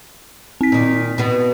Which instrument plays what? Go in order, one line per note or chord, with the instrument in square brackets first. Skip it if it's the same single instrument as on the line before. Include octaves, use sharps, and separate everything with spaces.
[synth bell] C4 B6
[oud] A#2 D#3
B2 B3